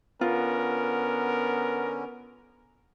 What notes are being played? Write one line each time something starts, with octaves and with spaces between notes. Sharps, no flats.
D3 B3 C#4 F4 A#4